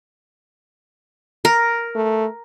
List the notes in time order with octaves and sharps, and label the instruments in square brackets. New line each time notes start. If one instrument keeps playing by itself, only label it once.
[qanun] A#4
[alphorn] A3